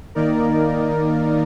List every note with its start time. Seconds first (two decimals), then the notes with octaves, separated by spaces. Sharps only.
0.15 D#3 A#3 D#4 A#4 D5